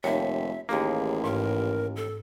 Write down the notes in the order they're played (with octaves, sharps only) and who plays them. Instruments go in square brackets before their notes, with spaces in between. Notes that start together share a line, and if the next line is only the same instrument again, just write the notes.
[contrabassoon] F1 [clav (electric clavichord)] D#2 [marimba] C#5 [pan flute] E5
[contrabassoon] A1 [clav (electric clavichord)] D#2 A#3 [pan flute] G#4
[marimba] G#2 [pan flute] A#4
[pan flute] A4